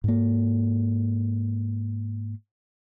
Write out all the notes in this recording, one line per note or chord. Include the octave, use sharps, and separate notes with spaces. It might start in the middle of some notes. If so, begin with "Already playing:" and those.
G#2 A#3